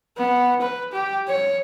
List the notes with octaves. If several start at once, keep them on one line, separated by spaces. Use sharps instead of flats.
B3
B4
G4
C#5